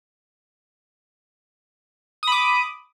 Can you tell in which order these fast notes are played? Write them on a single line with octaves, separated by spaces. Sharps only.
D#6 B5 D6